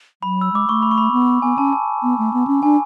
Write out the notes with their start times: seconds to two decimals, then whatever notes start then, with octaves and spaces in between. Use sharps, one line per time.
0.22 F#3 B5
0.41 E6
0.53 G#3 D6
0.68 A3 C#6
0.82 B5
0.91 C#6
0.98 B5
1.12 B3
1.42 B3 G#5
1.58 C#4 A5
1.73 A5
2.03 B3
2.18 A3
2.33 B3
2.47 C#4
2.63 D4 G#5